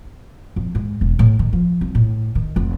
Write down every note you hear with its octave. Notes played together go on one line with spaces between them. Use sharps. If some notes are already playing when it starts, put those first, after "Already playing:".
F2
G#2
E1
A2
D#3
F3
C2
A2
D#3
F1